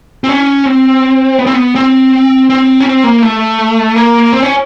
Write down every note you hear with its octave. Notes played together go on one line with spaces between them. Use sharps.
C4
C#4
C4
B3
C4
B3
C4
C4
C#4
C4
A#3
A3
A#3
C4
C#4